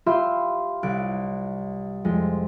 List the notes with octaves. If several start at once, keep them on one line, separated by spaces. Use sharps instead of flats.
F4 G4 E5 B5 C6
C2 F#6 D7
F2 G#3